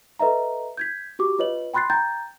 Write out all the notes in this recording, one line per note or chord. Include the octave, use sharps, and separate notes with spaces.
A4 B4 D#5 E5 A#5
G6 G#6 B6
F#4 G4 D6
F4 B4 C#5 D#5 F#7
G5 B5 C6 F#6 A6 C7
G5 A#5 G6 A6